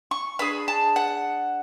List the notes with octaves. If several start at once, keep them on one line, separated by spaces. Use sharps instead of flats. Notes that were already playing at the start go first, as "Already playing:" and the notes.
C#6
D4 G#4 B5
A5
F#5